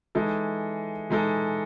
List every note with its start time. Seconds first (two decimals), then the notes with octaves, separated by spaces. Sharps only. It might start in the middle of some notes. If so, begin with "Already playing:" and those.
0.15 E3 G#3 D#4 A4
1.10 E3 G#3 D#4 A4